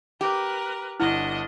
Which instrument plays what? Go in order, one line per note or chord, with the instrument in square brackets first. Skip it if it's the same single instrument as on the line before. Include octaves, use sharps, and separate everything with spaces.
[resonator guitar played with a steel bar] G4 [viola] A#4 B4
[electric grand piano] G1 F#5 F6 [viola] D4 D#5 [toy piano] E4